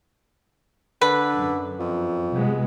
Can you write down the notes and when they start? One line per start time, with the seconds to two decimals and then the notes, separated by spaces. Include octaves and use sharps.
1.01 D3 B4
1.35 F#2
1.79 F2
2.33 C3 G#3 B3